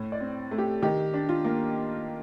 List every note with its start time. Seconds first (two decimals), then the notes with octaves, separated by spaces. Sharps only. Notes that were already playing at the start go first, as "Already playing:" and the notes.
Already playing: A2
0.12 D5
0.20 C4
0.51 A3
0.58 G4
0.83 D#3 G4
1.14 D4
1.29 F4
1.44 A#3